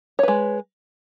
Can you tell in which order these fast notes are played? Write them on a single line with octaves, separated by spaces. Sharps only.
C#5 B4 G#3